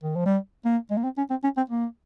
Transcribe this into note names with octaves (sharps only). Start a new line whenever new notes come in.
D#3
F3
G3
A#3
G#3
A#3
C4
C#4
C4
C#4
C4
A#3